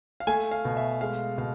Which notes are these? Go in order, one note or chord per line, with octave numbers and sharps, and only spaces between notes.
F5
A3 G#5
F5
B2
E5
G#3 F5
B2 F5